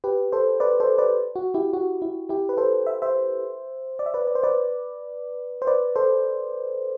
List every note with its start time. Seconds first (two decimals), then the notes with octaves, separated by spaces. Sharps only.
0.04 G4 B4
0.33 A4 C5
0.60 B4 D5
0.80 A4 C5
0.98 B4 D5
1.36 F#4
1.54 E4 G4
1.73 F#4
2.02 E4
2.29 E4 G4
2.49 B4
2.57 A4 C5
2.87 E5
3.02 C5 E5
3.99 D5
4.06 E5
4.14 B4 D5
4.27 D5
4.35 C5
4.43 B4 D5
5.62 C5
5.67 B4 D5
5.96 A4 C5